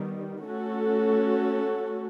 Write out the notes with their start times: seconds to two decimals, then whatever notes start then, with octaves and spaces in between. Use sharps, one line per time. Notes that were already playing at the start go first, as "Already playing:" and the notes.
Already playing: D#3 G3 B3
0.45 A3 C#4 F#4 A4